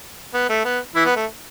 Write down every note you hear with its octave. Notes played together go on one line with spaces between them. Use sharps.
B3
A3
B3
E3 E4
B3
A3